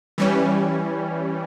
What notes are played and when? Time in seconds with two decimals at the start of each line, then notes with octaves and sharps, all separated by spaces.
0.18 E3 G3 C#4